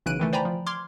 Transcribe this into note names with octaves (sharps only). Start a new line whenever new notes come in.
B1 C#3 E3 F#6 D7 D#7
D#3 E3 A3
C5 D5 G5 G#5 A#5 B5
F3
C6 D6 F6 G#6